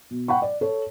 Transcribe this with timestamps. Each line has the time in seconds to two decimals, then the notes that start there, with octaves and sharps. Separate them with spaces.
0.11 B2
0.28 F#5 G5 B5 C#6
0.42 D5
0.61 A4 C#5